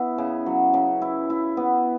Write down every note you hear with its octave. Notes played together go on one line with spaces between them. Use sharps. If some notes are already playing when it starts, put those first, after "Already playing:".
Already playing: B3 E4
C#3
F#3
C#3
E4
E4
B3